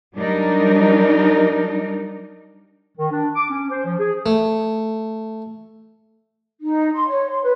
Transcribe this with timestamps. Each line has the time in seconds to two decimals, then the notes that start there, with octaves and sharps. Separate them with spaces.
0.15 F#3 G3 D4 D#4 A#4
2.98 D#3
3.11 D4
3.35 D6
3.50 C#4
3.70 C5
3.85 F3
3.99 G#4
4.26 A3
6.61 D#4
6.93 C6
7.08 C#5
7.29 C6
7.42 B4